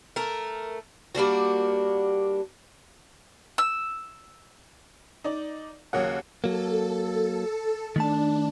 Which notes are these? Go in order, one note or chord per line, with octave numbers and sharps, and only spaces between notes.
A3 A#4
G3 A#3 D4 F#4
E6
D#4 D5
D#2 C#3 F#3 A#3 F#5
F#3 A#3 A4
D#3 A3 D4 A5